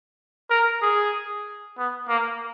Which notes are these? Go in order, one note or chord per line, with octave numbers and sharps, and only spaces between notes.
A#4
G#4
B3
A#3